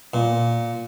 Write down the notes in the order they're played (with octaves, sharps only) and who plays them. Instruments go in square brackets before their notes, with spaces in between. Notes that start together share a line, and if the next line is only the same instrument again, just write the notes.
[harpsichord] A#2